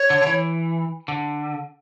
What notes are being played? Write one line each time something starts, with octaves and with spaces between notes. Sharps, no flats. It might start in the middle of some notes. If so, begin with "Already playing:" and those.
Already playing: C#5
D3
D3
E3
D3